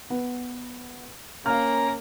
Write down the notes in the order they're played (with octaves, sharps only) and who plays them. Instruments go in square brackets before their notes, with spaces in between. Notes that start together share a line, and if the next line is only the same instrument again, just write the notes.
[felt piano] B3
[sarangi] A#3 [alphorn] C#4 [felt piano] F5 F6 [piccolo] A#5